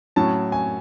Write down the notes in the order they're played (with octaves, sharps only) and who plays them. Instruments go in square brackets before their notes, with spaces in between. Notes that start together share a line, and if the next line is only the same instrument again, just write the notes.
[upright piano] A2 F#3 C#4 A5
G#5